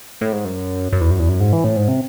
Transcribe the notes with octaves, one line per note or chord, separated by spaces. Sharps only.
A2
G#2
F#2
F#2
E2
F#2
E2
F#2
G#2
E3
A2
G#2
C3